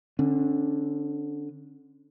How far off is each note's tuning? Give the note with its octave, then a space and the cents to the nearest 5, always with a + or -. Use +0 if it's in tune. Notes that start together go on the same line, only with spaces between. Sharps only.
D3 +0 C#4 -35